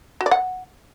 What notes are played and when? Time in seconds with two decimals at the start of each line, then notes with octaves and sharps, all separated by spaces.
0.21 F#4
0.26 D5
0.31 F#5